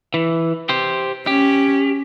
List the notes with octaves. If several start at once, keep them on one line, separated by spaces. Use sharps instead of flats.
E3
G4 C5
C#4 G4